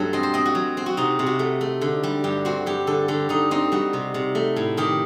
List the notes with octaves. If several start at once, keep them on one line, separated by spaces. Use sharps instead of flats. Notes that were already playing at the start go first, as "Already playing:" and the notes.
Already playing: G2 F#3 A3 A4
C4 D#5
C5
C4 D#5
F#4
F#3
C4
F#4
C3 D#4
C3
F#4
A3
A3
D3
G3
G2 G4
C4 F#4
G2 G4
D3 A4
D3 G4
D3 D#4
C4 D#4
G3 F#4
C3
C3
A3
A2
D#3 G4